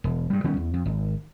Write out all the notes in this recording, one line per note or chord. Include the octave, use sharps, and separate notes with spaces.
E1
G2 G3
D#3 G3 B3 C#4
E2
F2
G#1